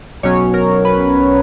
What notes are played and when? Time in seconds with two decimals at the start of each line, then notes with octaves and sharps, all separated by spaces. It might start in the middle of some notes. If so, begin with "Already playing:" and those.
0.23 B1 B2 F#3 C#4 C#5
0.54 A#4
0.85 B4